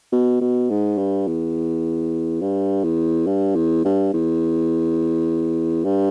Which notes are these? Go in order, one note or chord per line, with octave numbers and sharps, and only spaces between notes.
B2
B2
G#2
G2
E2
G2
E2
G2
E2
G2
E2
G2